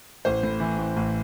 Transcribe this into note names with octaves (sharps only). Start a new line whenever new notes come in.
A1 C5
A2
E3
A1
A1